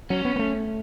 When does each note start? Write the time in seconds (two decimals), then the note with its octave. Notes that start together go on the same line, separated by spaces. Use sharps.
0.10 F#3 C#4
0.25 B3
0.36 B3
0.39 A3